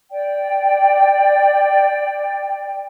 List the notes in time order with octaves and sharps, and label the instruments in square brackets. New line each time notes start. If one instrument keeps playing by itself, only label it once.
[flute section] D5 G5